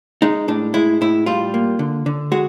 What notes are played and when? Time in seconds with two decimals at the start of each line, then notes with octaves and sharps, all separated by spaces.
0.22 G#3 D#4
0.48 A2 D4
0.74 G#3 E4
1.01 A2 E4
1.26 G3 F4
1.54 A#3
1.79 D3
2.06 D3
2.32 G#3 F#4